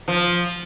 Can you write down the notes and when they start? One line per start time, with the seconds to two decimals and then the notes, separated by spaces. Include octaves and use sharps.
0.08 F3